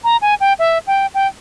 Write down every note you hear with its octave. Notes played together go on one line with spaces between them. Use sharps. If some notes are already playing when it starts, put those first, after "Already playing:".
A#5
G#5
G5
E5
G5
G5